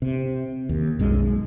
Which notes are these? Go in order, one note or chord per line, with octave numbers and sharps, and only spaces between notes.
C3
D#2
B1 F#2 G#3